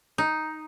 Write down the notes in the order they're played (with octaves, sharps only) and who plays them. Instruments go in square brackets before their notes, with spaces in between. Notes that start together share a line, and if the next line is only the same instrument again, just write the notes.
[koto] D#4